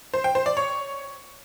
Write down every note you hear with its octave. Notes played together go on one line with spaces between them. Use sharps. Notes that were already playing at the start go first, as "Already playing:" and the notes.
C5
G5
C5
D5
C#5